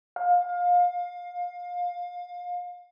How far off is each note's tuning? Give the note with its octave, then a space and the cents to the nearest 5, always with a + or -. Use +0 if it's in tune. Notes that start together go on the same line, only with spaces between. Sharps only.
F5 +25